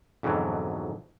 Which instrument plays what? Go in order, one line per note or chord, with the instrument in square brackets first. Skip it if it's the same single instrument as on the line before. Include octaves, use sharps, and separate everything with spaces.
[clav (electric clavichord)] F2 G#2 B2 D3 E3 F#3